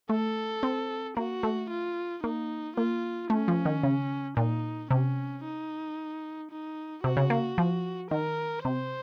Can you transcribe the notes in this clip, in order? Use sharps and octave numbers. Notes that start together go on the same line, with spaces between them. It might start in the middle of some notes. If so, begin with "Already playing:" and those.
A3 A4
C4
A#3 F#4
A3
F4
A#3 D#4
A#3 F4
A3 C#4
F3
D#3
C#3
A#2 D#4
C3 C#4
D#4
D#4
C3 F#4
C#3
A#3
F3
D#3 A#4
C3 C5